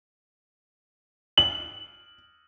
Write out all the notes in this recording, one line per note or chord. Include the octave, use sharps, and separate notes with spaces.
F#7